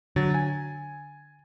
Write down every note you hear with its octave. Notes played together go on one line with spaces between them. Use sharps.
D3 F#3 A6
G#5